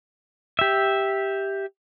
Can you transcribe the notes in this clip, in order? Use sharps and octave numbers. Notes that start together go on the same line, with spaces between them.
G4 E5